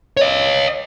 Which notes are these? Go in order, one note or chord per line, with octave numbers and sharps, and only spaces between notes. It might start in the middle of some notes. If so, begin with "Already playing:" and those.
C#5 D#5